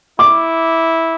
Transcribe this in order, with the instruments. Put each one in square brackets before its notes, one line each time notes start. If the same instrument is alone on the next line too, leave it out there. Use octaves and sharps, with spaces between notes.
[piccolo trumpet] E4 [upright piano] D6